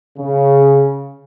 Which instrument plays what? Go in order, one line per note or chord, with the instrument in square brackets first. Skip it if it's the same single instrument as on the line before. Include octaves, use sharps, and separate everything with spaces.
[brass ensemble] C#3